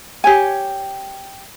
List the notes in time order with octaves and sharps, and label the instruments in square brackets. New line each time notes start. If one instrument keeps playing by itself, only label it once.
[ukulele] G4 C#5 G#5